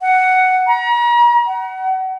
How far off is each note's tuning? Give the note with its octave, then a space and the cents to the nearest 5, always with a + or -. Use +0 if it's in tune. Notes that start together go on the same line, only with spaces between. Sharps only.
F#5 +5
A#5 +40
F#5 +30